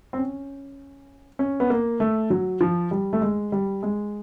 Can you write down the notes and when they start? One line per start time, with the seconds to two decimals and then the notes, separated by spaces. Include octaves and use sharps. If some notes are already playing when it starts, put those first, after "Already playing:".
0.13 C4
0.18 C#4
1.39 C#4
1.60 B3
1.70 A#3
2.00 A3
2.30 F#3
2.61 F3
2.91 G3
3.13 A3
3.22 G#3
3.52 G3
3.83 G#3